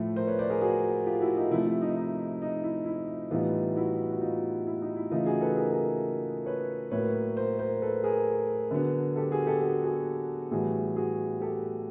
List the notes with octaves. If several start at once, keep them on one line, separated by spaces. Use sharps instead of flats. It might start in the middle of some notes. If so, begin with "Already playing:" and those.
Already playing: A2 F3 A3
A#4 C5
B4 C#5
C5 D5
G#4 A#4
F#4 G#4
F4 G4
E4 F#4
D#4 F4
C3 F3 A3 E4
E4
D#4
D#4
D#4
E4
E4
A2 E3 G3 B3 D#4 F4
E4 F#4
F#4
D#4 F4
E4
D#4
E4
C#3 E3 A3 D#4 F4
F#4 G#4
A4 B4
G#4 A#4
G#4 A#4
B4 C#5
A2 F#3 A#3 B4 C#5
A#4 C5
A#4 C5
A4 B4
G#4 A#4
D3 F#3 B3
G4 A4
F#4 G#4
G4 A4
F#4 G#4
F#4 G#4
A2 E3 G3 B3 F#4 G#4
F#4 G#4
G4 A4